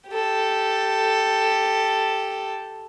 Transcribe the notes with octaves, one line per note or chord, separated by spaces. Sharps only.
G4 A4